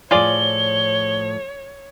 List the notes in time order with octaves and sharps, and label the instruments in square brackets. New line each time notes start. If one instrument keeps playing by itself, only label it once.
[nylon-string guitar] A2 F3 [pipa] F4 G#4 D5 [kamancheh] C#5 [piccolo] G7